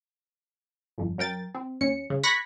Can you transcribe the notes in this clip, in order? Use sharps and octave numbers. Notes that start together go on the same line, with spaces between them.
G1 F2
F#2 A#4 G5 A6
C4
D#2 C#4 C#7
C#3
B5 C#6 F#6 G#6 A#6 B6